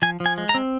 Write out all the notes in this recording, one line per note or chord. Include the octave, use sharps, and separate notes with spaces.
F3 G#5
F3
G#5
G#3
A#5
C4